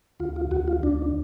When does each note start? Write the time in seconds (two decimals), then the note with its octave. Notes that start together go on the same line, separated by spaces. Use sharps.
0.20 D2 F4
0.36 F4
0.51 D2 F#4
0.68 F4
0.83 D2 D4